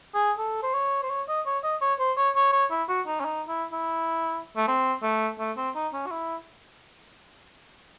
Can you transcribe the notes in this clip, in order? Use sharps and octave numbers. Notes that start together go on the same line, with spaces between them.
G#4
A4
C5
C#5
C5
C#5
D#5
C#5
D#5
C#5
C5
C#5
C#5
C#5
E4
F#4
D#4
C#4
D#4
E4
E4
A3
C4
A3
A3
C4
D#4
C#4
F#4
E4